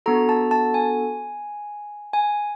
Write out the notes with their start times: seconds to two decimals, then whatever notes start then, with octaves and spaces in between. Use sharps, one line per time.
0.06 B3 D4 F#4 A4 A#5
0.29 A5
0.51 A5
0.74 G#5
2.13 G#5